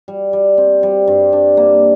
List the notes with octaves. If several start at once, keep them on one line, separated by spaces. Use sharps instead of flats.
G3
G3
C4
G3
G2
D4
A#3